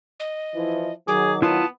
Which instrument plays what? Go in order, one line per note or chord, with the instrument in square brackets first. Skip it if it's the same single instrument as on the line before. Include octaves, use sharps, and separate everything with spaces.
[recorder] D#5
[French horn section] E3 F3 E4
[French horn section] D#3 F#3 [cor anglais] G#4 [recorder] D6
[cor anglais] B3 [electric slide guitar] E4 F4 [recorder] A5